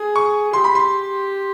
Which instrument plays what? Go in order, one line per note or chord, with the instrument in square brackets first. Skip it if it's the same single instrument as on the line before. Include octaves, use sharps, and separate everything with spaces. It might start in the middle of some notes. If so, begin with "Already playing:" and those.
Already playing: [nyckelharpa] G#4
[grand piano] C#6
[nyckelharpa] G4 [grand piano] C6
[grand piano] B5
C6